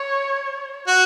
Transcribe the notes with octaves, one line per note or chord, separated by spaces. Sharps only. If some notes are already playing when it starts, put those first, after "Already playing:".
Already playing: C#5
F#4